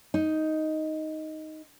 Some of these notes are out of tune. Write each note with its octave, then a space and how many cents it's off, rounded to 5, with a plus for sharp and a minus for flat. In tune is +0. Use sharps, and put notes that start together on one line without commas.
D#4 +5